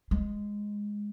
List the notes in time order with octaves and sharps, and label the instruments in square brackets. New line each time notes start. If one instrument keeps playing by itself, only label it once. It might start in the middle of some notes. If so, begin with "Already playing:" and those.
[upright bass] G#3